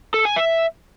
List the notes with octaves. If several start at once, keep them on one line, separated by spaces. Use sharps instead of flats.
A4
G#5
E5